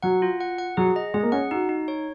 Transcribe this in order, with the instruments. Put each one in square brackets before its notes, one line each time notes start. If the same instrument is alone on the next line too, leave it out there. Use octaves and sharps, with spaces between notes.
[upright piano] F#3 [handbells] F#5
[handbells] F4
F#5
F#5
[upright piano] F#3 [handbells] G#4
[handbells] D#5
[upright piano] G#3 [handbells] G#4
[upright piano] A#3
[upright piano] C#4 [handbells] F#5
[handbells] D#4 [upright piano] F#4
[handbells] D#4
C#5